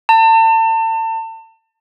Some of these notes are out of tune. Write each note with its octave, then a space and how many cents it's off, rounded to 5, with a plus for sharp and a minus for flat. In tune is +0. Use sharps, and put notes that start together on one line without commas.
A5 +35